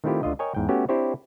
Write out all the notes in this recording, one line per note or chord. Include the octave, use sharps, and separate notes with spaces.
D#3 A3 C4 E4 F4 G4
D2 D3 F4 D#5
A#4 C#5 D#5 G5 G#5
E2 G#2 G5
A3 B3 C#4 F#4 G4
C4 D4 E4 G4 C5 C#5